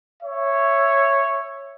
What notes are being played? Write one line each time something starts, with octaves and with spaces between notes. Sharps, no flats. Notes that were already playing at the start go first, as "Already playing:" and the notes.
C#5 E5